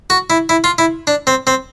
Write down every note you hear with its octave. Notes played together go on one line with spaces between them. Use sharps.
F#4
E4
E4
F4
E4
D4
C4
C4